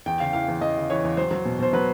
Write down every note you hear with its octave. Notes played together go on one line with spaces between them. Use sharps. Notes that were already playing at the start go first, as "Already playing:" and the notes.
E2 G5
C#3 F5
E3 F5
E2
E2 D#5
C#3
E3 C#5
E2
F#3 C5
F#3
B2
B2 C5
F#3 B4